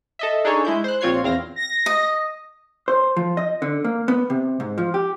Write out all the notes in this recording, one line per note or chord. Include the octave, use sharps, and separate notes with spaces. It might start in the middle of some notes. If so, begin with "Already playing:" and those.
A4 D#5 E5
D4 D#4 G#4 A4 C#5
G#3 E4 G6
C5 F#6
A#1 C4 F4 C#5 G#6 C7
E2 C4 F5 A#6
A#6
D#5
C5
F3
D#5
D3
A#3
B3
C3
G#2
F3
G4